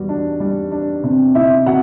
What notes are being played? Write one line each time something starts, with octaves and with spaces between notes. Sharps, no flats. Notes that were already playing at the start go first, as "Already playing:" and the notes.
Already playing: E2 G3 F#4
D4
G3
D4
C3
C3 E4 E5
C3 F#4 F#5